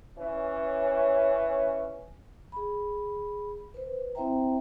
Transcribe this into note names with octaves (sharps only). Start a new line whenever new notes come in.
E3 C#4
G#4 B5
B4 C5
C4 E4 C5 E5 G5 A#5